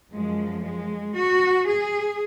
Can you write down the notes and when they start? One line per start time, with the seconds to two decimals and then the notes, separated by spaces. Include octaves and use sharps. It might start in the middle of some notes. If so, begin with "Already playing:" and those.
0.12 F#2 F3 G#3
0.63 G#3
1.15 F#4
1.66 G#4